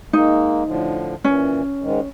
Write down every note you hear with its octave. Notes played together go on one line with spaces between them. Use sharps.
G#3 A#3 D#4
A2 D3 F3
A#2 E3 C#4
G#2 D#3 G#3